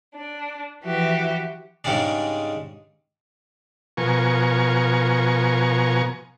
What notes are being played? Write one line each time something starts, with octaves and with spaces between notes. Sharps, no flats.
D4
E3 F3 F#4 G4 E5
G#2 C#3 G3 G#3 D4
B2 F3 A#4 G#5 C#6